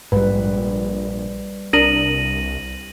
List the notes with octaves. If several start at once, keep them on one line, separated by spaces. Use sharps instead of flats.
A#1 G#2 G3 B4
C2 D4 A#4 D#6 A#6 D#7 F#7